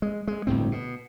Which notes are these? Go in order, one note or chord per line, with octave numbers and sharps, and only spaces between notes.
G#3
G#3
G1 D2 A2 C4
B2